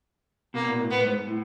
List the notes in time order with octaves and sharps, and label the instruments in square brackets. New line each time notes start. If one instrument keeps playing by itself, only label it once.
[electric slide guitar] B2 [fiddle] A#3
[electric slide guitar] A#2
A2
[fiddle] B3
[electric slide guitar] G#2
A2